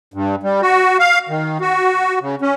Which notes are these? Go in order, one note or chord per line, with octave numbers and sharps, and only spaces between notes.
G2
G3
F#4
F5
D#3
F#4
C#3
C#4